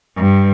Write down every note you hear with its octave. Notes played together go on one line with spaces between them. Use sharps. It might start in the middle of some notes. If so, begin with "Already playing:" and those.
G2